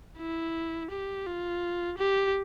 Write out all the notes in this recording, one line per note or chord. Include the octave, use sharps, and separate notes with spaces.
E4
G4
F4
G4